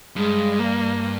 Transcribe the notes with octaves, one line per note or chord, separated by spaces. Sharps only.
G2 G#3
A#3